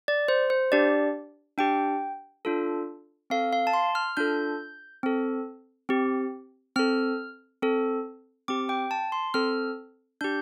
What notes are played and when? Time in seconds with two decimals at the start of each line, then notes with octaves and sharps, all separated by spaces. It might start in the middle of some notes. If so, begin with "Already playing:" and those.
0.08 D5
0.28 C5
0.50 C5
0.72 D4 G4 D5
1.58 D4 G4 G5
2.45 D4 F4 A4
3.30 C4 A4 F5
3.53 F5
3.67 A5
3.73 C6
3.95 F6
4.17 D4 F4 A4 G6
5.03 C4 A4
5.89 C4 G4
6.76 C4 A4 F6
7.62 C4 A4
8.48 C4 G4 D6
8.69 G5
8.91 A5
9.12 C6
9.34 C4 A4 F6
10.21 D4 G4 G6